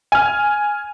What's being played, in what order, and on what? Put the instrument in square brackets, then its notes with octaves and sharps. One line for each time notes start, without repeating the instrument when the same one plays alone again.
[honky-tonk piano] G#5 F6